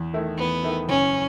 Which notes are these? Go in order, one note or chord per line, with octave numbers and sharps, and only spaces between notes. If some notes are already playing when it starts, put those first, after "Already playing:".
Already playing: E2
D#3 A3 E4
E2 B3
D#3 A3 E4
F#1 C#4